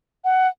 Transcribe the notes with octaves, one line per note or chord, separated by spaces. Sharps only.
F#5